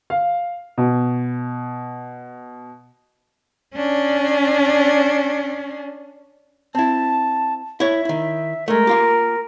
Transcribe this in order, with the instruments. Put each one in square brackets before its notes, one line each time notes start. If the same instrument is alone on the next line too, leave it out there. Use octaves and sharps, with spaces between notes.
[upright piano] F5
B2
[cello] C#4 D4
[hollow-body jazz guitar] C4 E4 [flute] A5
[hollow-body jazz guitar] E4 C#5 [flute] E5
[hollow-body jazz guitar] D#3 E4
[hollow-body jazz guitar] G#3 A3 [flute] A#4
[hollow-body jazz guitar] A#3 F4 G4